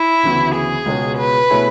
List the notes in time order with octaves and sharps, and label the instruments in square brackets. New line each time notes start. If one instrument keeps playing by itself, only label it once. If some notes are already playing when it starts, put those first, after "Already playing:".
Already playing: [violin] E4
[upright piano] D2 C#3 E3 B3 F#4
[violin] G#4
[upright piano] C#2 B2 G#3 C#4 F#4
[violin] B4
[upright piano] B2 A3 E4 G#4 C#5